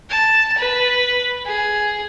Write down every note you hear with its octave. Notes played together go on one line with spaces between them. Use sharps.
A5
B4
G#4